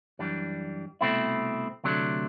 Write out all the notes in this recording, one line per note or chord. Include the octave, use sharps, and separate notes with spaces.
F#2 E3 G3 D4
C2 B2 A3 C4 E4
D2 C3 F#3 A3 D4